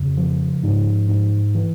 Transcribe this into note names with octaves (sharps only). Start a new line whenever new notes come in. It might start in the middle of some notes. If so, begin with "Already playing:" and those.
Already playing: F2 C#3
F3
G#2
G#2
E3